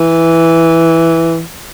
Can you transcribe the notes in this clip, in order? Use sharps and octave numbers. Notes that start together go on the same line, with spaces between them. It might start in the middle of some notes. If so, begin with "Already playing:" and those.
Already playing: E3